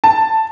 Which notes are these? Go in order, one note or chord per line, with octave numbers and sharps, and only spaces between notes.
A5